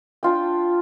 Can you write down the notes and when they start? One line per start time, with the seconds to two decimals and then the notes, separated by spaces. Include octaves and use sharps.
0.23 D4 F4 G5